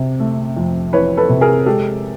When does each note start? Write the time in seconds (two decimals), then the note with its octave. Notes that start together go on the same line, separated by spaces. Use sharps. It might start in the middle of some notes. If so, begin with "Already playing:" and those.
Already playing: C3
0.20 A3
0.57 F2
0.93 E3 B4 C#5
1.17 A4 B4
1.29 C3
1.41 G#4 A#4
1.66 G#3 G4 A4